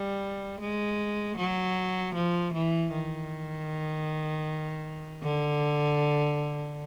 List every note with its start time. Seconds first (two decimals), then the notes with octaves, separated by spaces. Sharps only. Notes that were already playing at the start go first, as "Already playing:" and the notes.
Already playing: G3
0.60 G#3
1.37 F#3
2.14 F3
2.53 E3
2.92 D#3
5.23 D3